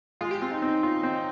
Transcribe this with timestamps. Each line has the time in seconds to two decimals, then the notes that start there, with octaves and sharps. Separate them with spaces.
0.21 G#3 F4
0.31 G4
0.41 C4 F4
0.51 D#4
0.62 C4
0.83 F4
1.03 C4